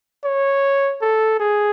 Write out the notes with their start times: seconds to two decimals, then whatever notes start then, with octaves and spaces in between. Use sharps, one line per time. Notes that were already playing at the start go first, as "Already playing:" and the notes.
0.24 C#5
1.02 A4
1.40 G#4